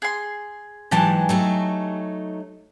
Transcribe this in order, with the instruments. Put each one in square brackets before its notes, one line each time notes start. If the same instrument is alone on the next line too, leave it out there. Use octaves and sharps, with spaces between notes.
[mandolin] G#4 C6
[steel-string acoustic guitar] G#2 E3 F#3 [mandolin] G4 G#5 A5
[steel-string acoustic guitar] F#3 A3 D#4